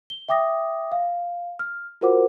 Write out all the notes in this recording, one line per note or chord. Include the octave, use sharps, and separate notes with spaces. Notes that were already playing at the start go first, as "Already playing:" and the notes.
G7
E5 G5 D6 D#6 A#6
F5
F6
F4 F#4 A#4 C5 F#5 D6